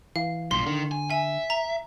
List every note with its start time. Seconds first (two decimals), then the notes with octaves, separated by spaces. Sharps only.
0.16 E3 F5
0.51 B1 G2 A#2 C6
0.66 D3 D#3
0.91 G#5
1.10 E5 G#5
1.50 A#5